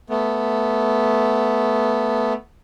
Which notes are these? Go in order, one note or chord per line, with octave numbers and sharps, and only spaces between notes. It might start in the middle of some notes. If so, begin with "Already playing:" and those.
A3 B3